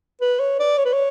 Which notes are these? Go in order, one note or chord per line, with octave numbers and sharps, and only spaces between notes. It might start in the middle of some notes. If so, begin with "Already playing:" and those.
B4
C#5
D5
C#5
B4
C#5